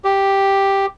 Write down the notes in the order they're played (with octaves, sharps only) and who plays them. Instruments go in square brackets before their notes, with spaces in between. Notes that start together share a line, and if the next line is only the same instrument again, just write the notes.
[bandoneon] G4